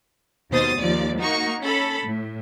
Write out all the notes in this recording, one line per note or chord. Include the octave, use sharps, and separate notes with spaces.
D#2 B2 C5 D#6 A6
D#2 F3 D5
A#3 D#4 F#4 C#6
C#4 A4 B5
A2